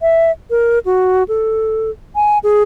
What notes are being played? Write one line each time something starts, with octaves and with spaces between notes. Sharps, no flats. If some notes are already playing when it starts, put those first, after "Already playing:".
E5
A#4
F#4
A4
G#5
G#4